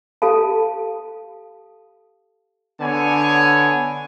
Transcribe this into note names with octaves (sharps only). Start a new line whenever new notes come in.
G4 A4 F5 A5
D3 B3 C#5 G#5